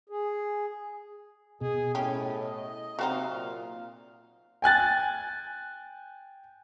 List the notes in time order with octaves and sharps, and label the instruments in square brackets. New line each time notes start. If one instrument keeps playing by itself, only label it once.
[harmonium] G#4
[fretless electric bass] B2 [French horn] G#4 [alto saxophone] D#5
[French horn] A2 [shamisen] C#4 G4
[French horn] C3 [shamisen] F#3 C4 D#4 [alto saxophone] F5
[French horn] A#2 [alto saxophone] F5
[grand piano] G5 G#5 F#6 A6